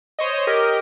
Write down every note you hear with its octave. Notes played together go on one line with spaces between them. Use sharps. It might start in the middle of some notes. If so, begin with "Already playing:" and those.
C5 C#5 D#5
G4 A#4 D#5